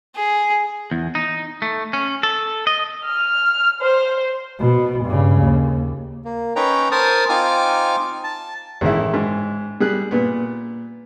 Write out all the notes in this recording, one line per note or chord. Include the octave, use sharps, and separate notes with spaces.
G#4
E2
D#4
A3
C#4
A4
D#5
F6
C5
B2
G2 C#3
D#2
A#3
C#4 D#4 B4 C#5 G5 A#5
A#4 C5 G#5 A5 D#6
C4 D#4 F4 G#5 D6 F6
A5
A1 D#3 G#3 E4
G#2
G3 G#4 F#6
A#2 B3